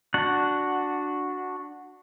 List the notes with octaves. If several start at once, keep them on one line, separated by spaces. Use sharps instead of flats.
D4 F#4 F#5